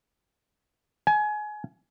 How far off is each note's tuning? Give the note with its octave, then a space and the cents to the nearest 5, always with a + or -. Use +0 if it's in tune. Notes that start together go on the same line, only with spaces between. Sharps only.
G#5 +25